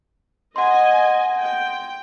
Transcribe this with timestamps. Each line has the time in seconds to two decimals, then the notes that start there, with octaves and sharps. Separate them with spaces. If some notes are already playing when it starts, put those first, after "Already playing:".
0.56 D#5 F#5 G#5 C6
1.39 G5